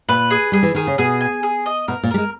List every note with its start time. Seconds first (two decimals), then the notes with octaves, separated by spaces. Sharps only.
0.08 A#2 B4
0.30 G#4
0.52 G3 G#4
0.63 E3
0.75 D#3 G#4
0.87 C#3
0.98 B2 G#4
1.21 G#5
1.43 G#4
1.66 D#5
1.88 B2 A#4
2.03 A#2
2.11 G3 A#4
2.18 G#3